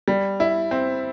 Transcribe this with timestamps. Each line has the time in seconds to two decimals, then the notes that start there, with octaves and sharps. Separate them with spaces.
0.08 G3
0.40 E4
0.71 C4